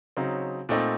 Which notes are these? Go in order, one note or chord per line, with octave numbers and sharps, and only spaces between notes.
C#3 F#3 C4 D#4
A#2 A3 C4 D#4